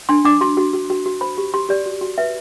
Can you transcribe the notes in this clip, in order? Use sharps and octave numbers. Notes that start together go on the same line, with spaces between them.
D4 C6
D4 D6
F#4 C6
F#4
F#4
F#4
F#4
C5 B5
G4
G4 C6
G4 D5
F#4
F#4
B4 E5